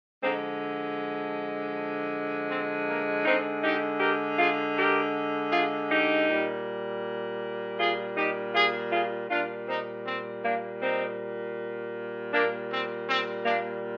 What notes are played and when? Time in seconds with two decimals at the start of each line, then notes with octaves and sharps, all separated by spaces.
0.22 D3 F3 G#3 C4 D#4
2.49 C4
2.87 A#3
3.25 D3 G#3 C4 D#4
3.62 D#4 G4
4.00 G4 A#4
4.38 F4 G#4
4.76 G4 A#4
5.52 F4 G#4
5.89 D#4 G4
6.27 A#2 G3
7.78 F4 G#4
8.16 D#4 G4
8.54 F4 G#4
8.91 F4 G#4
9.29 A#2 G3 D4 F4
9.67 C4 D#4
10.05 C4
10.43 A#3 D4
10.81 C4 D#4
12.32 A#2 G3 A#3 D4
12.70 C4
13.08 C4
13.45 A#3 D4